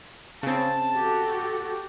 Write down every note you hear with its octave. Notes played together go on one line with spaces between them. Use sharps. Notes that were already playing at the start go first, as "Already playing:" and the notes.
C#3 C4 A5
F#4 G4 A4